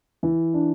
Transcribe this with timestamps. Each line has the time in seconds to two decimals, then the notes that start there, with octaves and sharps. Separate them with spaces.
0.23 E3
0.54 D4